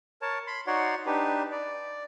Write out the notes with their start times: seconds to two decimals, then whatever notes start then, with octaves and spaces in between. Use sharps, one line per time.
0.22 A#4 C#5 A5
0.47 B5 C6
0.67 D#4 F#4 C#5 D5 F#5 C6
1.06 D4 D#4 G4 B4
1.52 D5